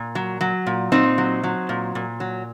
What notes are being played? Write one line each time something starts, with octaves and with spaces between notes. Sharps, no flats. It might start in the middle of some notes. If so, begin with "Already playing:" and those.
Already playing: A#2
F#3
F#3
A#2
A#2 C4 D#4
F#3
F#3
A#2
A#2
F#3